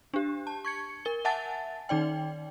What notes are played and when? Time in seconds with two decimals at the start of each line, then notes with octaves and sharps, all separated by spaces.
0.14 D4 G4
0.47 A5
0.65 C#6 G#6 C#7
1.05 A#4 G7
1.25 E5 F#5 G#5 A5 A6
1.89 D#3 D#4 D5 G5